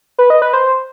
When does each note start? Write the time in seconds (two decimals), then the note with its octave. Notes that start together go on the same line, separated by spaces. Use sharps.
0.19 B4
0.30 D#5
0.42 B4
0.53 C5